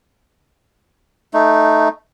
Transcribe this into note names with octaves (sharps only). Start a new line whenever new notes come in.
A3 D#4